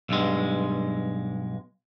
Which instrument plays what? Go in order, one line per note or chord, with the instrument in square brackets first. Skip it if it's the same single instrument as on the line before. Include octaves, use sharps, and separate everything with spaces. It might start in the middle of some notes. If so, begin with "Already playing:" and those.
[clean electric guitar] B1 G2 G#3